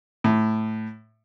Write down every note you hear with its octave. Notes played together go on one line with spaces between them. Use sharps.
A2